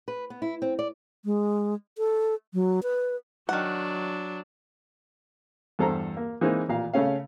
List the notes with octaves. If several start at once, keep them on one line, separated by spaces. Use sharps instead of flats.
B4
B3
E4
C4
D5
G#3
A4
F#3
B4
D#3 F#3 D4 F#5
E2 G2 A4 C5 A#5
A#3
E3 G#3 A#3 C4 D#4 E4
A1 A#2 F5
C#3 A3 C#4 F5